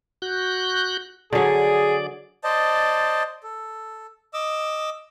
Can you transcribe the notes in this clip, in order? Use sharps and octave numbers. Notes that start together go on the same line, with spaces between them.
F#4 F#6 G6
D3 F#3 G#4 D5
C5 D5 D#5 A5
A4
D#5 D6 E6